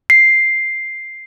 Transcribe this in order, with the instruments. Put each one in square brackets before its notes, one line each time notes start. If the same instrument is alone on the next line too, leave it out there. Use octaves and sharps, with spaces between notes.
[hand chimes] C7